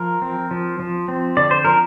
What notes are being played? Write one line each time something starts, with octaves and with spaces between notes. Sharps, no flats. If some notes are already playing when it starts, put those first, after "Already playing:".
Already playing: F3 A#4
C4
F3
F3
C4
D3 D5
C5
F3 A#4